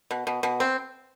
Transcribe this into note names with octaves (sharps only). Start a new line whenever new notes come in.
B2
B2
B2
C4